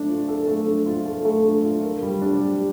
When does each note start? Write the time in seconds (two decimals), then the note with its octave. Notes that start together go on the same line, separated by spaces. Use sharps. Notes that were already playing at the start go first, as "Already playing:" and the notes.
Already playing: A3 D4
0.08 F4
0.28 A4
0.47 A3
0.66 D4
0.86 F4
1.06 A4
1.25 A3
1.44 D4
1.64 F4
1.83 A#4
2.02 G3
2.22 D4
2.41 G4